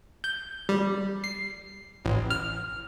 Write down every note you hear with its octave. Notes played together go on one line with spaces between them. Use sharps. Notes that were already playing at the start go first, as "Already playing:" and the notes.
G6
G3
C7
A1
F6